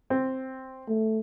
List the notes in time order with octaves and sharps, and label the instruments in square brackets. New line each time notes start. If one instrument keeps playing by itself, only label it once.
[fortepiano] C4
[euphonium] A3